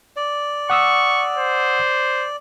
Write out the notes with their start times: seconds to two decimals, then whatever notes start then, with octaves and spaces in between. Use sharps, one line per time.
0.16 D5
0.70 F#5 C#6 D#6 E6
1.36 C5